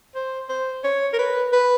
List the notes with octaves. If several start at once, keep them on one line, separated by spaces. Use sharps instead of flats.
C5
C5
C#5
A#4
B4
B4